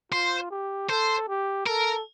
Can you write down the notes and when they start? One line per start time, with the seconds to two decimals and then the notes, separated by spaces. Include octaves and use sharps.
0.12 F4 C5
0.51 G4
0.89 A4 C5
1.29 G4
1.67 A4 A#4